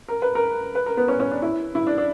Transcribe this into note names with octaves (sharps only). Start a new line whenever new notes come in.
A#4
B4
A#4
B4
A#4
B3
C#4
C#4
D4
E4
E4
D4
D4